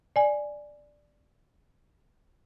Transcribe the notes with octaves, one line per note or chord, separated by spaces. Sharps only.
D5 G#5